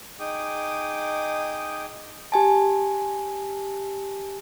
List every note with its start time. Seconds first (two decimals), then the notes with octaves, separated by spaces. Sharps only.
0.20 D#4 G#4 G5 D6 D#6
2.32 G4 G#5 A5